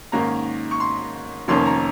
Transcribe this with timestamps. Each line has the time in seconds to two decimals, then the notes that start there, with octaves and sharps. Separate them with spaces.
0.12 G#2 D#3 A#3 C#4 A#5
0.71 C#6
0.80 C6
1.48 F1 F2 D#3 A#3 C#4 C6
1.66 A#5